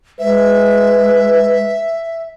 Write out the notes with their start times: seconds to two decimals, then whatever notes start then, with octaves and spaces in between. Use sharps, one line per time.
0.19 G#3 B4 E5